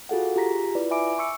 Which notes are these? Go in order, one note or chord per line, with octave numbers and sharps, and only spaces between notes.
F4 F#4 G#4 A4 F5 F#5
F4 G4 G#4 A#5 A#6 B6
E4 F4 B4 D5
E5 G#5 B5 D6 D7
C#6 E6 C#7